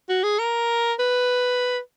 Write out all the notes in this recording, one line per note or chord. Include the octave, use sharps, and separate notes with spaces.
F#4
G#4
A#4
B4